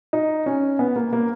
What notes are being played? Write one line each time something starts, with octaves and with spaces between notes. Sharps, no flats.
D#4
C#4
B3
A#3
A#3